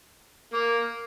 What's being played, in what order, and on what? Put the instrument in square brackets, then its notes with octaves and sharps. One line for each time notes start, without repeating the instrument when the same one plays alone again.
[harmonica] A#3